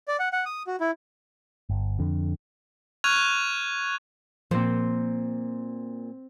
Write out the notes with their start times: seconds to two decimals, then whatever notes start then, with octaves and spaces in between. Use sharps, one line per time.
0.08 D5
0.19 F#5
0.33 F#5
0.46 D#6
0.67 F#4
0.80 E4
1.70 G1
1.99 F2 D3
3.04 C#6 F6 F#6 G#6 D#7 F7
4.51 A#2 F3 A#3 C4 C5